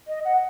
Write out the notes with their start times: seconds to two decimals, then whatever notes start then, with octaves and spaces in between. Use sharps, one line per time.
0.07 D#5
0.25 F#5